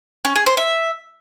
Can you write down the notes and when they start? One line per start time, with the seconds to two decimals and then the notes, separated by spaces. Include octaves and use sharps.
0.25 C#4
0.36 G#4
0.46 C5
0.57 E5